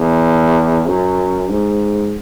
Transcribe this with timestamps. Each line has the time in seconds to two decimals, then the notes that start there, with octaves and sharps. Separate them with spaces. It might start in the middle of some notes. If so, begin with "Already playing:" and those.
Already playing: E2
0.88 F#2
1.50 G#2